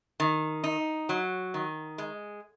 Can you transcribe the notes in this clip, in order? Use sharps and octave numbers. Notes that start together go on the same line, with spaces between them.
D#3
D#4
F#3
D#3
G#3